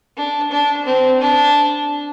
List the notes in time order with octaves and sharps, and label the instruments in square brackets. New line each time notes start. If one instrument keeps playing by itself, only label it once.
[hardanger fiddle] D4
D4
C4
D4